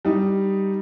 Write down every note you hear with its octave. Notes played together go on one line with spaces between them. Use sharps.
G3 D#4